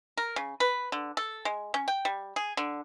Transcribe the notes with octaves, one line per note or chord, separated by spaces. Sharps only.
A#4
C#3
B4
D3
A4
G#3
C#4
G5
G3
G#4
D3